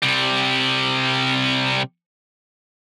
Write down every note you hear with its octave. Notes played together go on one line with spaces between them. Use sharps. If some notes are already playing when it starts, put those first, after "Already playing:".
C3 G3